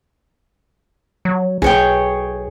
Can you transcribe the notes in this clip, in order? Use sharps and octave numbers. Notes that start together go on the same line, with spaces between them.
F#3
B1 G#4 C#5 G5